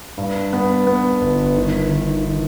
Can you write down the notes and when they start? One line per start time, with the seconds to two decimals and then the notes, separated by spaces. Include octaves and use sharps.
0.18 G2
0.53 B3
0.87 B3
1.21 G1
1.56 D#3
1.90 D#3
2.25 D#3